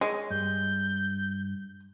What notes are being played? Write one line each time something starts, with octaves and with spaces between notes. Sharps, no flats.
G#3 C#5
G2 G6